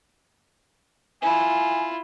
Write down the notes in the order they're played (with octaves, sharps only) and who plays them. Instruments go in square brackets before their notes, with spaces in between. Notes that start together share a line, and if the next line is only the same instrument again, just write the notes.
[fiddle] E4 F4 [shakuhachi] G#5